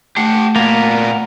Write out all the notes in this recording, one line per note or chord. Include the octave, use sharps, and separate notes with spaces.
A3 G4 F#5
A#2 A#3 B3